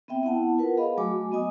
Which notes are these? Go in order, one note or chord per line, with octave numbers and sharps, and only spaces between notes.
B3 C4 E5 G5
B3 E4 F#5 A5
F4 A#4 B4 F#5
G#4 D#5 F5 B5
F#3 A3 F#4 G#5 D6
B3 D#5 G#5 D#6